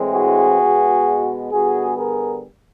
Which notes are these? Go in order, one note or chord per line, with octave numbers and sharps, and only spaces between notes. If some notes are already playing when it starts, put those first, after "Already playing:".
Already playing: A2 E3 G#3 C4
F#4 G#4
B2 G#3 B3
D3 G3 B3 F#4 G#4
G#4 A#4